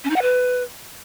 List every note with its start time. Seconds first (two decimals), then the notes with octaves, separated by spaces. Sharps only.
0.04 C#4
0.10 D#4
0.16 F#5
0.22 B4